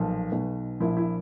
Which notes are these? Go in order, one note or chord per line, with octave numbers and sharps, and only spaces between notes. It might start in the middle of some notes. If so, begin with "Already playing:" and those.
Already playing: B1 A#2 F3
B1 B2
A#1 A#2 F3 E4
E4